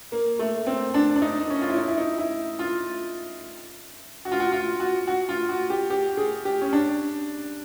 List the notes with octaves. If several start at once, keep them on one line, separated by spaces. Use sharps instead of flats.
A#3
A3
C4
D4
D4
D#4
C#4
F4
E4
D#4
E4
D#4
E4
F4
F#4
F4
F#4
F4
F#4
F#4
F4
F#4
G4
G4
G#4
G4
C#4
D4